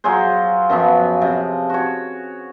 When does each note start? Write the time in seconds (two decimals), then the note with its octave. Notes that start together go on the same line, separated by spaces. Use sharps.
0.04 F#3 F4 G#4 C5
0.69 F#2 F3 B3 B5
1.22 C3
1.70 F#4 C#5